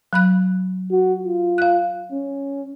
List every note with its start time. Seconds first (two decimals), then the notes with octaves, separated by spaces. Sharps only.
0.13 F#3 B5 F#6
0.91 F#4
1.24 F4
1.58 F5 F#6
2.12 C#4